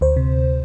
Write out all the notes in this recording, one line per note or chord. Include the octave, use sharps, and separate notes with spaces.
D2 C5
C3